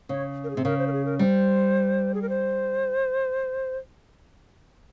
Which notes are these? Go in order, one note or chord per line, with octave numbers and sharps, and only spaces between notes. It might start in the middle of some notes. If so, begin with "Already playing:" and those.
C#3 C#5
A#4
G#4
C3
C#3 A#4
C5
A#4
G#4
A#4
G3 C5
G#4
A#4
C5